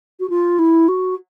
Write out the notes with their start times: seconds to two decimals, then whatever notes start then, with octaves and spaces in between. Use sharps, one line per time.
0.20 F#4
0.30 F4
0.59 E4
0.88 F#4